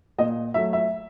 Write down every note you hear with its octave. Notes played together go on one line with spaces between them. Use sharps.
A#2 D#5
F#3 A3 E5
E5